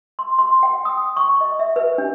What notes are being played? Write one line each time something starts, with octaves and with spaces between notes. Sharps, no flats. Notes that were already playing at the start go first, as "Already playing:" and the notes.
C6
C6
G5
D#6
C#6
D#5
E5
B4
D4